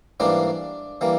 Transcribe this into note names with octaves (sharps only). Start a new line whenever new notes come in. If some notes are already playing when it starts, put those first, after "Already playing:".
G#2 E3 G3 A#3 D4 D5
E3 G3 A#3